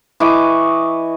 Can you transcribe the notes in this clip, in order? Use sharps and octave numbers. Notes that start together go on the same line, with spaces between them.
E3 D#5 C#6 D6